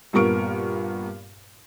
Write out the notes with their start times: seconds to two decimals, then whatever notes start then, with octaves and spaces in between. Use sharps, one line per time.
0.13 G2 A#2 B3 A#4 C#6 D7